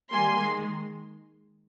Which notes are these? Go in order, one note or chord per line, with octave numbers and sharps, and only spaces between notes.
D#3 G3 A#3 G#5 C6
D#3 G#3